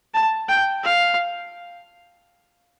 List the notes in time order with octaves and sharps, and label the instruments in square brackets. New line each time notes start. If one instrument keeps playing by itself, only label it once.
[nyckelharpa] A5
G5
F5